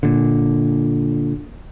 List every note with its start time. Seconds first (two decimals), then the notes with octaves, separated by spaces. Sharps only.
0.03 A#2 D3